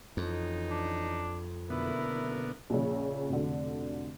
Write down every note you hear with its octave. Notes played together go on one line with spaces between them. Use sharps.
F2 E3 C#4 D#4
D4
F#1 B2 D3 A3 B3 E4 A#4
A#1 C#3
F1 B2 D3